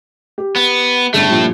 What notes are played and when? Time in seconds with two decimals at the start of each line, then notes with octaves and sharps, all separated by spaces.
0.38 G4
0.56 B3
1.14 G1 C#2 A2 A3
1.30 G2 A#2 F3